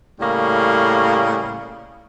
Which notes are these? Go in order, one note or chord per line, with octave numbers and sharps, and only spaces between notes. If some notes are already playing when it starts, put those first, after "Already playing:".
A2 C#3 G3 A#3